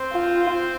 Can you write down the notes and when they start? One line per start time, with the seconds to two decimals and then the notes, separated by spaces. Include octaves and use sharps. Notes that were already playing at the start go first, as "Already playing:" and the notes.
Already playing: C4 C5
0.12 F4